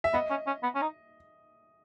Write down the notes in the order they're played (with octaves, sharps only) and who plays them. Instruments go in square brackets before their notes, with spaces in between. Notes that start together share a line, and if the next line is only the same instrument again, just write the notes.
[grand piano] E5
[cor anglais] B3 [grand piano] D#5
[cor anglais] C#4
C#4
B3
C#4
D#4